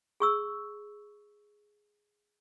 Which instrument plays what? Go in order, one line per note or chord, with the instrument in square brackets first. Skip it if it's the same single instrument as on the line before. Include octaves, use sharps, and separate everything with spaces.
[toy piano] G#4 C#6 E6